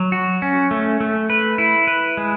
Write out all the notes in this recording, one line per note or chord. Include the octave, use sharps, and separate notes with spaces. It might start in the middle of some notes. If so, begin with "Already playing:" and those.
Already playing: F#3
F#4
C#4
A3
A3
B4
E4
B4
G#3